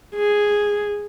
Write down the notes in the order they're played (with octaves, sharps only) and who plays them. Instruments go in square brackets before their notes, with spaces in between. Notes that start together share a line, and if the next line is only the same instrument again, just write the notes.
[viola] G#4